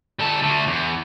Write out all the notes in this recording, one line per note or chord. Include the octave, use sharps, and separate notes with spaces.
G3 A4
D3 A3
E2